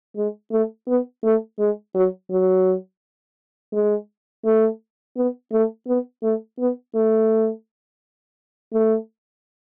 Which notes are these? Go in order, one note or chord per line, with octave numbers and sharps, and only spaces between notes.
G#3
A3
B3
A3
G#3
F#3
F#3
G#3
A3
B3
A3
B3
A3
B3
A3
A3